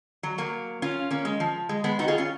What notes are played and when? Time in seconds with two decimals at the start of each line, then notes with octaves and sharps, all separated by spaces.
0.23 F#3
0.38 F#3 A#3
0.82 C#4 F4
1.11 A#3 C#4
1.25 G#3
1.40 F3
1.69 G#3
1.84 G#3 B3
1.99 D#4 F#4
2.08 F4 G#4
2.18 C#4 F4